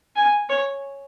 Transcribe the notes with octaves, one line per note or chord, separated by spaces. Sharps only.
G#5
C#5